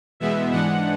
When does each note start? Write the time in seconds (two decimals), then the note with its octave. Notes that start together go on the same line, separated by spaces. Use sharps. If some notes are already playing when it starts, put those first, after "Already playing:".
0.20 E2 B2 G#3 B3 E5
0.51 G#2 E3 G#3 D4 F#5